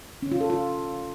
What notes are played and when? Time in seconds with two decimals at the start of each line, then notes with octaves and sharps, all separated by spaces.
0.22 C#4
0.32 F4
0.41 A4
0.50 F4